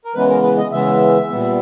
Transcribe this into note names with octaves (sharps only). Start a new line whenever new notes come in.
A#4
C#3 E3 G#3 B3 B4
A#4
B4
D#5
C#3 E3 G#3 B3 E5
A#2 G3 B3